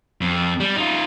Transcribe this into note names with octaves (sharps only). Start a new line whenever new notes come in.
F2
G3
D#4 F4